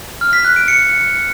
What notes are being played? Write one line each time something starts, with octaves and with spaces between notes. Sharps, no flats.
F6
B6
F#6
D7
C#7